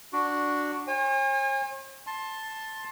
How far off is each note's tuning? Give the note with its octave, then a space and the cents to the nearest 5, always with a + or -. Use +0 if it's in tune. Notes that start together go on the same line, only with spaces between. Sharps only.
D4 +0 F#4 +0
C#5 -45 G#5 -35
A5 +0 C6 +20